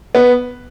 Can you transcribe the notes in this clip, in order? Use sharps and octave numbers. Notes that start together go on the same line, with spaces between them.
B3